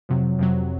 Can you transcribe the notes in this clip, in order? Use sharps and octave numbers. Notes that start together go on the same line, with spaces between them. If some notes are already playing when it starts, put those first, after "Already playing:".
F2 C3 F#3
F2 C3 F#3